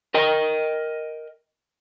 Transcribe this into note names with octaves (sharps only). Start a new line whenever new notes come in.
A#4 D#5 G5